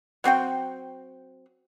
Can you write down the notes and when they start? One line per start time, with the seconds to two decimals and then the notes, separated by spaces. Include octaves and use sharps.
0.24 F#3 C4 F#4 G5